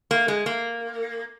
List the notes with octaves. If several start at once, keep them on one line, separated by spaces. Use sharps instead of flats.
A#3
G#3
A#3